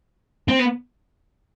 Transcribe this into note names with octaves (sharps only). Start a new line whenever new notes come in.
C4
B3